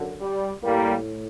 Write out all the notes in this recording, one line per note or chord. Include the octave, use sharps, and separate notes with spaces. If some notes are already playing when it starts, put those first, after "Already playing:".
Already playing: F#2 D3
G3
A2 G3 A#3